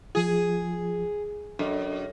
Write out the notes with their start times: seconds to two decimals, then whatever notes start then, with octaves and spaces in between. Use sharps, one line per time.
0.15 F3 F4 G#4
1.59 F#2 D4 A4 D#5